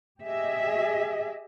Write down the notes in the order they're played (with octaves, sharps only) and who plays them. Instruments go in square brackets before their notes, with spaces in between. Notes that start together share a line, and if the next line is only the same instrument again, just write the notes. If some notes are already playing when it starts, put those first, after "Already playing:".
[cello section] G4 G#4 D#5 E5